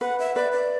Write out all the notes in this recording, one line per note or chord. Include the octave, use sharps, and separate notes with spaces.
B4 F#5
E5
B4 D5
D5